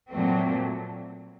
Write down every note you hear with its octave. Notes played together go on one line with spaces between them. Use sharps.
A#2 F#3 A3 C4